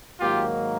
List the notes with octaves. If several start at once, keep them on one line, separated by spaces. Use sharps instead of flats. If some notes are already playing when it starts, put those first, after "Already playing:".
G#2 D#3 F#3 A#3 F4 G4